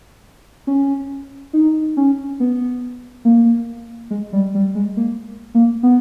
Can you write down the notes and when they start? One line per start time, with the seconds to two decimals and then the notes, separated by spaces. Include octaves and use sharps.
0.67 C#4
1.53 D#4
1.97 C#4
2.40 B3
3.25 A#3
4.10 G#3
4.33 G3
4.55 G3
4.75 G#3
4.97 A#3
5.54 A#3
5.83 B3